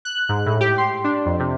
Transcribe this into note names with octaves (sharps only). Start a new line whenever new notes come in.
F#6
G#2
A2
G4
C6
D4
F2
C3